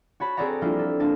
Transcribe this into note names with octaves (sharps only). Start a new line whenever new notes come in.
F#4 C#5 A5 B5
C4 G#4 A4 D5 F#5 A#5
F3 G3 A#3 D4 E4 F4
A4
A#3 D4 A5 A6